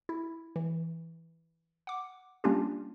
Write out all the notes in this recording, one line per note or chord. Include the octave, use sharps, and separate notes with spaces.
E4
E3
F#5 D6
G3 A#3 C#4 D4 F4 G4